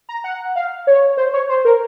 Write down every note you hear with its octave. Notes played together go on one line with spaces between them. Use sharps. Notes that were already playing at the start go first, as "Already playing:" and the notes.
A#5
F#5
F5
C#5
C5
C#5
C5
A#4